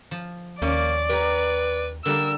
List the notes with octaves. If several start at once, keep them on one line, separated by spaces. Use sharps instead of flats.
F3
D#2 A#3 C#4 D5
G4 A#4 B4
D3 G3 A#3 A#4 E6